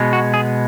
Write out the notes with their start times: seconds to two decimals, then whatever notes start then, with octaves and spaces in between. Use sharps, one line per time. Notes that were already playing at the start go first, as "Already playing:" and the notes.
Already playing: B2 G#3 B3
0.13 F#4
0.34 G#4